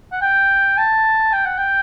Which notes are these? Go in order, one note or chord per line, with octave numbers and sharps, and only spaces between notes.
F#5
G5
A5
G5
F#5
G5